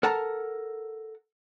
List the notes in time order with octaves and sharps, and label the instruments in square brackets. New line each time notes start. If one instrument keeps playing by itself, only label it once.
[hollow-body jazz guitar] A4 A#4 F#5 A5 A#5